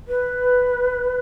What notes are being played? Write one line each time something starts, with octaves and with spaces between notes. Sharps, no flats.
B4